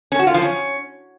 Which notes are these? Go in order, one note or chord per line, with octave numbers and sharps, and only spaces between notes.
C#4
F#4
F4
F3
C#4